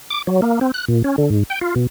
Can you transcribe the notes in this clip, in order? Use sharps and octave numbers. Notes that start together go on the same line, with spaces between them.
D6
F#3
A#3
C4
F#6
A#2
C#4
D3
G#2
G5
F4
B2